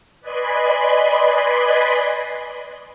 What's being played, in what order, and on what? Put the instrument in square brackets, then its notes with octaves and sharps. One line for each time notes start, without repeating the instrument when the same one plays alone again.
[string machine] B4 D5 D#5 G#5 B5 C6